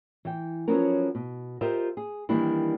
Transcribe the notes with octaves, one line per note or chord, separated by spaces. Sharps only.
E3 G5
F3 F#3 B3 C#4 A#4
B2
F4 G4 A#4 C5 D#5 E5
G#4
D#3 E3 G3 A#3 D4 E4